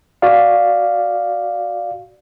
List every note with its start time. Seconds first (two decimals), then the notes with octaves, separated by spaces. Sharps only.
0.22 F#4 D5 F5